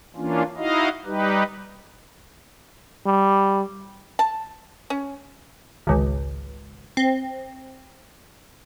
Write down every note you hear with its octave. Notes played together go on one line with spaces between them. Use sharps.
E3 A#3 C#4 D4 F4
D#4 E4 F#4 D#5 F5
G3 D#4 G4 B4
G3
A5
C#4
G#1 C#2
C4